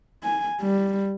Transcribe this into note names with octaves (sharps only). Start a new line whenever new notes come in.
G#5
G3